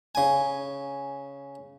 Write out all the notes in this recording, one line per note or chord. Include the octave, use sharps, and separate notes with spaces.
C#3 G#5